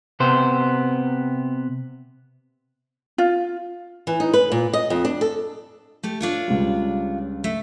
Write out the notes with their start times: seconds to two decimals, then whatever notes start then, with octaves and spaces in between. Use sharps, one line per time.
0.20 C3 B3 C5
3.18 F4
4.07 E3
4.20 D#4
4.34 B4
4.52 A#2
4.73 D#5
4.90 F2
5.05 D4
5.21 A4
6.03 A3 G4
6.21 D4 F4 C#5
6.48 C#2 G3
7.44 A3